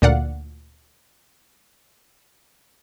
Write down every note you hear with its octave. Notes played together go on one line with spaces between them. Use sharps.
D2 A#2 D5 F5 F#5